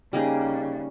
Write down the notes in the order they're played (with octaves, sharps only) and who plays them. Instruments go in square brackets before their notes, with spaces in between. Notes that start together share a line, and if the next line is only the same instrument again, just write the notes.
[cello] C#3 [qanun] G3 A#3 D#4 G#4